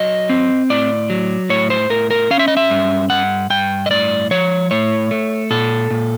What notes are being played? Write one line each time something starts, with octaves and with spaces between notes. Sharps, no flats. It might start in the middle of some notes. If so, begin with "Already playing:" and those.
Already playing: F#3 D#5
C4
A2 D5
F#3
A2 C#5
C5
A2 A#4
A#4
C#4 F5
E5
D#5
E5
G2
G2 F#5
G2 G5
D#5
A2 D5
F3 C#5
A2 C#5
A3
A#2 A4
A#2